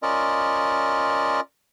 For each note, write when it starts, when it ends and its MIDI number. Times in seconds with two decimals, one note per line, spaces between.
0.03 1.40 61
0.03 1.40 65
0.03 1.40 70
0.03 1.40 74
0.03 1.40 75